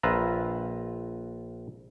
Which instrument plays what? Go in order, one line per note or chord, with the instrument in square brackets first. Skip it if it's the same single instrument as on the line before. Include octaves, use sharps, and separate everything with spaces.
[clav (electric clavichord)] A#1 F4 B4 E5 A#5